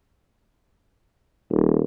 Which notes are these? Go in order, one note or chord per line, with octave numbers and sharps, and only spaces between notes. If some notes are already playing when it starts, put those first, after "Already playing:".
D#1